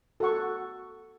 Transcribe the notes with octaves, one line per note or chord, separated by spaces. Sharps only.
F#4 A4 F#5 C#6